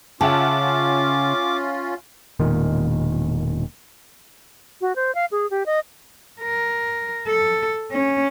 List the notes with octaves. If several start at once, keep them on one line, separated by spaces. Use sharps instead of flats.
C#3 C#4 F4 E5 F#5 A5 D6
E1 A#2 D#3
F#4
C5
F5
G#4
G4
D#5
A#4
A4
C#4